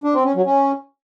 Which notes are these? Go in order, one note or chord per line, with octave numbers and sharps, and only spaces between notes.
D4
C4
C#4
F#3
C#4